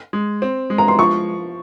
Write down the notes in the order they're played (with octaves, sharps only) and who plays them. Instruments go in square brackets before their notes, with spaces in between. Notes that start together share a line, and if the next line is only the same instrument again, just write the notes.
[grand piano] G#3
C4
G#3
[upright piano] A#5
C6
[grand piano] F3 [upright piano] C#6